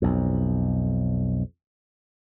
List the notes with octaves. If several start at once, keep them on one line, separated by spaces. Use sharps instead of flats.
B1 F2